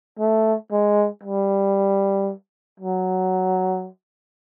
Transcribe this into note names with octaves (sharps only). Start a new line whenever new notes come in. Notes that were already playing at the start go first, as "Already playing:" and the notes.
A3
G#3
G3
F#3